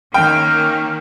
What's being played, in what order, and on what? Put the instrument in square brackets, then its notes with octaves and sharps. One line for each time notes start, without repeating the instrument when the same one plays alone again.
[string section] D#3 A#3 C#4 [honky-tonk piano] G5 [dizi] F6